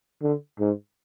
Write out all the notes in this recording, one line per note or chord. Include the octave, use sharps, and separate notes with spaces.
D3
G#2